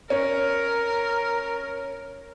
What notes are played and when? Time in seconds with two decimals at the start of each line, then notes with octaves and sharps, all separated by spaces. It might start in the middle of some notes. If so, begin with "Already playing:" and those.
0.10 C#4 A#4